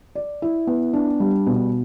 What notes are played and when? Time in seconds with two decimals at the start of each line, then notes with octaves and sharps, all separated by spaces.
0.15 D5
0.42 E4
0.67 B3
0.93 D4
1.20 G3
1.46 B2